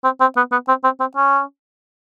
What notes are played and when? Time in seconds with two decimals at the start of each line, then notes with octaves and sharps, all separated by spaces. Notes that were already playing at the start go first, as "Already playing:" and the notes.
0.04 C4
0.21 C4
0.37 B3
0.52 B3
0.68 C4
0.84 C4
1.00 C4
1.16 C#4